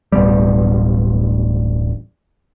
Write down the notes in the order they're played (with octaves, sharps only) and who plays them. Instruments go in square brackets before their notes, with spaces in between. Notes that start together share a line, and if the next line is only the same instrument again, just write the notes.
[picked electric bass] D1 A1 B2 G3